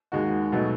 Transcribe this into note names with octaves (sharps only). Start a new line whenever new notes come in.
D#2 D#3 G#3 D#4 F#4
B2 F#3 A3 D#4